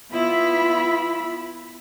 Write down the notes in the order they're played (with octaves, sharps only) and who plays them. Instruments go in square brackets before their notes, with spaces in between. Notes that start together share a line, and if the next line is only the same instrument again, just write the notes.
[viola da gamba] B3 E4 [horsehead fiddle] F4 B5